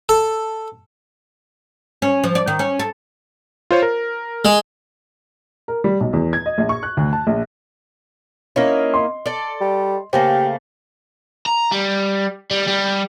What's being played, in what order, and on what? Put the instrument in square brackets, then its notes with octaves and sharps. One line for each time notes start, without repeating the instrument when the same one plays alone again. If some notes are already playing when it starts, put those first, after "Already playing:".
[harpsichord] A4
[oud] C#4
F3
D5
D#3
C#4
A4
[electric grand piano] F4 C5 C#5
A#4
[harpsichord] G#3
[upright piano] A#4
G3
B1
E2
G#6
D#5
A#1
C#6
F#6
D2
A5
A#1
[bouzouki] A#3 D#4 E4 [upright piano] C#4
[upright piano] D#5 C6
[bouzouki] A4 D5
[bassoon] G3
[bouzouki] C#3 A3 A#3 [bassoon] G4 [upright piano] C5
[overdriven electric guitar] A#5
G3
G3
G3